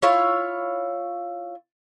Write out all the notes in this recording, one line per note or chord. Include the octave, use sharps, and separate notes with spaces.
E4 F4 C#5